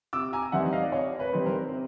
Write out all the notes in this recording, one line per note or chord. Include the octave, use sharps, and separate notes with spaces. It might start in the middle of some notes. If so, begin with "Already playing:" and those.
C3 D6 E6
G#5 A#5
E3 G3 C4 D#4 E5 F#5
D#5 F5
D5
C3 C#5 D#5
B4 C#5
E3 G3 C4 D#4
A#4 C5
C3